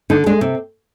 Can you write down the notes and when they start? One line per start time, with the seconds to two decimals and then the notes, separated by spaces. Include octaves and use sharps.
0.10 D3 D#4
0.26 G#3 D4
0.41 C3 C4